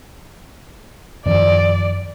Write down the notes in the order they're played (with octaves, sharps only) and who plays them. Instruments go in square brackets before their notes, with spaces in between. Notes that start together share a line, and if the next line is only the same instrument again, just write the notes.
[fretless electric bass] F#2 D#3 F3 [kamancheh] D5